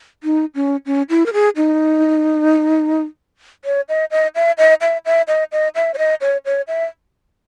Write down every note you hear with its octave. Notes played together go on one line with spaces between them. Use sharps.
D#4
C#4
C#4
E4
A#4
G#4
D#4
C#5
D#5
D#5
E5
D#5
E5
E5
D#5
D#5
E5
C#5
D#5
C#5
C#5
E5